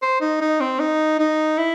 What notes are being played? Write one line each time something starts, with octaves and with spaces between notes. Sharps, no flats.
C5
D#4
D#4
C4
D#4
D#4
E4